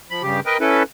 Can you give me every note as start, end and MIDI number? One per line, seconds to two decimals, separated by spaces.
0.10 0.22 53
0.10 0.22 83
0.23 0.40 43
0.23 0.40 49
0.23 0.40 67
0.46 0.57 70
0.46 0.57 71
0.46 0.57 75
0.46 0.57 79
0.61 0.83 61
0.61 0.83 64
0.61 0.83 69
0.61 0.83 71